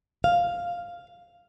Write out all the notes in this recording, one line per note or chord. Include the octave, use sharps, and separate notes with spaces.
F5